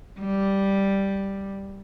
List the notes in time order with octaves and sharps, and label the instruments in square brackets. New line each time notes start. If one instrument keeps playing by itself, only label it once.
[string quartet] G3